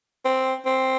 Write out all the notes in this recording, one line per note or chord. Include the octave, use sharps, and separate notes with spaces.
C4
C4